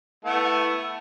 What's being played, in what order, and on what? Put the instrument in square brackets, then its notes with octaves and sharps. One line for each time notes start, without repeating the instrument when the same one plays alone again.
[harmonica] A3 B3 E4